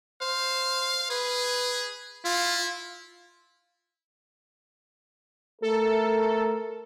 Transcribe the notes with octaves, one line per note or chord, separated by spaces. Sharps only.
C5 F5
G#4 B4
E4 F4
A3 A4 A#4